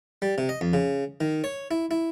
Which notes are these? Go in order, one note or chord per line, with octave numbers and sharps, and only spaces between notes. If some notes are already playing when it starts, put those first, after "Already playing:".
G3
C3
D#5
F2
C#3
D#3
C#5
E4
E4